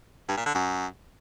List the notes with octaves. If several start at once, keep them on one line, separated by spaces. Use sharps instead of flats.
G2
A#2
D3
F#2